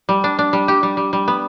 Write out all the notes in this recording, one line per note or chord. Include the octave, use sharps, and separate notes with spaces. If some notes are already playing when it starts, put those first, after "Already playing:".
G3
D4
D4
G3
G4
G3
G3
G3
B3